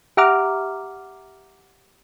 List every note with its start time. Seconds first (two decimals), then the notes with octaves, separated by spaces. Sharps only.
0.17 G4 E5 F#5 A#5 D6 F6